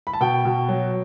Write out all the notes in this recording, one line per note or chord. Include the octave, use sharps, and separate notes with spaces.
B5
A5
B2 G5
B2
F#3